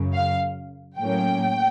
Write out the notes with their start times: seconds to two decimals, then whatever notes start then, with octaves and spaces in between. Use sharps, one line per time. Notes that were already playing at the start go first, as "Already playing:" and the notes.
Already playing: F#2 C#3
0.14 F5
0.98 A2 F#3 A#3 C#4 G5